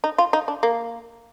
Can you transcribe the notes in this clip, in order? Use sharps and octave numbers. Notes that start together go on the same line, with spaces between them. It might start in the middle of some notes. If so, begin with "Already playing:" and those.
D#4
F4
D#4
D4
A#3